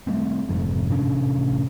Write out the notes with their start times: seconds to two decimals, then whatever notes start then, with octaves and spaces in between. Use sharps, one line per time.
0.07 G3 A3 C4
0.49 F1 F2 G#2
0.89 A1 C3 C#4 D4